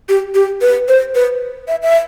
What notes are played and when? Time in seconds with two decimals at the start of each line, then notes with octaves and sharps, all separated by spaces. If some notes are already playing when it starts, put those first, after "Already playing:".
0.09 G4
0.35 G4
0.61 B4
0.88 C5
1.15 B4
1.68 E5
1.82 E5